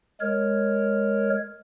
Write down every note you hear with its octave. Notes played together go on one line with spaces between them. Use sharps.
G#3 A#4 C#5